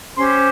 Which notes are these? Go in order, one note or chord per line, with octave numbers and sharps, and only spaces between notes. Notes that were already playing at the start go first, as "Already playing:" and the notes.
C#4 G4 C5 C6